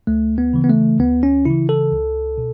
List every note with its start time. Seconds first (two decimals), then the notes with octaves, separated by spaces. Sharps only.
0.07 D2 A3
0.38 B3
0.54 C#3 E3
0.64 B3
0.69 A3
0.99 D2 B3
1.23 C#4
1.45 C#3 E3 E4
1.69 A4
1.92 C#2
2.38 B2